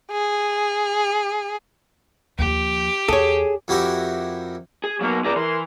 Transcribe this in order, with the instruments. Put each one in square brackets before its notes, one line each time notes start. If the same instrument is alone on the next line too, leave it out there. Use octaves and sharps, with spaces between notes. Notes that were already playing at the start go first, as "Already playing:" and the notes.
[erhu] G#4
[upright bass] D#2 F3 [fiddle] G4
[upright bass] E2 [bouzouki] G#4 [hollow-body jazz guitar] A4 C#5
[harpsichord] F2 E4 F#4 G4 A#4 E5
[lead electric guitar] G#4
[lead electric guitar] F#3 B3 [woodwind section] A#3
[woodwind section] C#2 A#5 D6 [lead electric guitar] G#4 D5
[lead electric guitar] E3 [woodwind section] A#4 C6